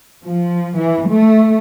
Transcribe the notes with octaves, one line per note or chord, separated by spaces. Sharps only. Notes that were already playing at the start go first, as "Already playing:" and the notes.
F3
E3
A3